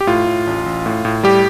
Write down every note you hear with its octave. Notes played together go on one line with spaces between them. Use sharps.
G4
A2 F4
A2
A1
A1
A2
A2
G3 G4